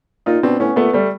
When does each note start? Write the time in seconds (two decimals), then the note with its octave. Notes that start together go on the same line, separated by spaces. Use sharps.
0.26 A#2 D#4 F4
0.43 B2 C4 D4
0.60 A2 B3 C#4
0.76 A#2 A3 B3
0.94 G3 A3